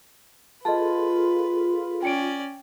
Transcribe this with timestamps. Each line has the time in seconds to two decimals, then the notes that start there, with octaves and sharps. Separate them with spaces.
0.65 F4 G#4 A4 B4 D#5 A5 C6
2.03 C#4 D5 G5 C#7 D7